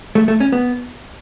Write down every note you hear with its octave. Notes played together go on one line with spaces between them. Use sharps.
A3
A3
C#4
B3